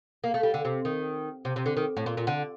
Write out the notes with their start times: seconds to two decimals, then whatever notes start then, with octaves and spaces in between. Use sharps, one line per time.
0.24 A#3
0.34 A3
0.43 G3
0.54 D3
0.65 C3
0.85 D#3
1.45 C3
1.56 C3
1.66 D3
1.77 D#3
1.97 A2
2.06 A#2
2.17 A#2
2.27 D3